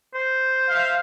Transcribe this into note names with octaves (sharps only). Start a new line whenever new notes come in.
C5
E5 F5